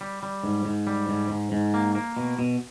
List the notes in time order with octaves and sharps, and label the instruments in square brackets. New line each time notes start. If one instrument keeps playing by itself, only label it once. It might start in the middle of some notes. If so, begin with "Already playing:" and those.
[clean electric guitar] G3
G3
G#2
G#2
G3
G#2
G#2
G#2
A#3
A#3
B2
B2